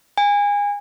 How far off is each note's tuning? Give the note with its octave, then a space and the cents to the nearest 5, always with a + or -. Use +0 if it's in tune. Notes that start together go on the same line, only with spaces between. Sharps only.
G#5 -30